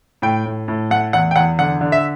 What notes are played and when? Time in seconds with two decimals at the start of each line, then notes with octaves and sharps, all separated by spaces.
0.22 A2 G5
0.46 A2
0.68 A2
0.91 A3 F#5
1.13 E2 F#5
1.31 G5
1.36 E2 F#5
1.59 D3 F#5
1.81 D3
1.92 E5